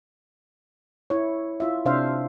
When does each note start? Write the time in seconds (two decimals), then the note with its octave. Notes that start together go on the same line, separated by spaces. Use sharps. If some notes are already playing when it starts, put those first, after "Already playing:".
1.10 E4 C#5
1.60 E4 F4 E5
1.85 C3 D4 C5 E5 F5